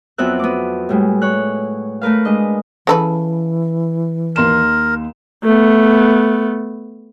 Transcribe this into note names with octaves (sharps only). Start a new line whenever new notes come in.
F2 F#3 B3 C4 E5 F#6
B3 D6
A2 G3 G#3
C#5 F#6
A3 A#4 B4 F5
G#3 D4 D#5
C#3 E3 A4 B4
D#2 A#4 C6 E7
A3 B3